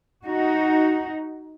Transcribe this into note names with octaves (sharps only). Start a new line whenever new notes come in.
D#4 F#4